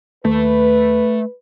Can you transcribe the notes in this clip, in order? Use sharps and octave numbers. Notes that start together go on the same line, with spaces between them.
D#2 A3 B4